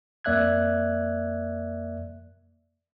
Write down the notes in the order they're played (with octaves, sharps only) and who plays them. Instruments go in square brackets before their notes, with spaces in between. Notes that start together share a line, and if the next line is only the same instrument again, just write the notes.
[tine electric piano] F2 A#3 D5 E5 F#6 G#6